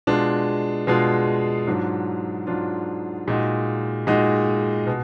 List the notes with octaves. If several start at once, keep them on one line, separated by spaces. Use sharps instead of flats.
B2 G#3 D4 F4
B2 G#3 D4 F4
G#2 F#3 D4 F4
G#2 F#3 D4 F4
A#2 G#3 D#4 F#4
A#2 G#3 D#4 F#4
B2